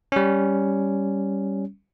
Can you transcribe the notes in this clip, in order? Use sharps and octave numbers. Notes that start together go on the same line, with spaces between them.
G3 C#4